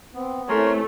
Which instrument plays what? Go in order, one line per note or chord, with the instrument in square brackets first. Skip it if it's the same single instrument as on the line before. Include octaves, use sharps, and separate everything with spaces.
[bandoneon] B3 [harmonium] C4
[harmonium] C3 E3 C#4 [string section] A3 [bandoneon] A#4 C#5 C6